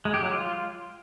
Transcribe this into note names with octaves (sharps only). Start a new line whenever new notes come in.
G#3
G4
F#3
F4